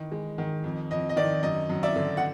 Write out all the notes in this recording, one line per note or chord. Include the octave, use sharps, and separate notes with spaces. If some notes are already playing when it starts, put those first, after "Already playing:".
Already playing: D#3 E3
G#3
D#3
F2
F2 D#5
D#5
D#3 D5
F#2 D#5
F#2
D5 E5
D3
F#5